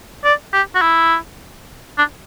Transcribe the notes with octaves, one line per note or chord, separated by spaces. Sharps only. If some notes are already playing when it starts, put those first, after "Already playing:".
D5
G4
F#4
E4
D4